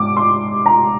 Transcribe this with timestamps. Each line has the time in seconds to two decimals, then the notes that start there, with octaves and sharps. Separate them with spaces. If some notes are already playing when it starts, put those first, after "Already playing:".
Already playing: G#2 D6
0.17 C6
0.66 A#5